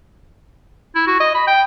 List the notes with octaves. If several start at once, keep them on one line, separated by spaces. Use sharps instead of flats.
E4
F#4
D#5
B5
G5